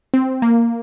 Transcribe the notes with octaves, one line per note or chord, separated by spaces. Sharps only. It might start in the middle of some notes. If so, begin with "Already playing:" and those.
C4
A#3